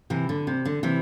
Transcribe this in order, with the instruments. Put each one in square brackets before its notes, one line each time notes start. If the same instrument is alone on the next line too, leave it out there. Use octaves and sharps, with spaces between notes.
[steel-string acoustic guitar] C3 E3
D3
C3
D3
C3 E3